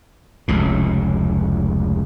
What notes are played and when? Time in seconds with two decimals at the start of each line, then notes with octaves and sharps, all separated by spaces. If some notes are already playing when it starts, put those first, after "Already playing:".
0.48 F1 C#2 A2